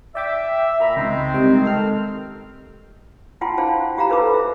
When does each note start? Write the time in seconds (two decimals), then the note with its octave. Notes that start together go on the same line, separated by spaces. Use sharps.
0.15 D5 E5 G5 D6
0.80 A#2 E5 A#5 B5
0.97 C#2 D#3 G#3 C4
1.34 C3 G3 G5
1.66 A4 F6
3.41 E4 F4 F#5 G5 A5 C6
3.58 D4 C5 F5 G5 A5
3.97 F4 G4 F5 A#5 B5
4.09 D#4 A4 B4 C5 A#5 D6
4.34 E5